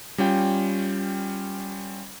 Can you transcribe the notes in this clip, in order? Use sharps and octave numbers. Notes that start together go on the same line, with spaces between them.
G3 C#4 F4 G5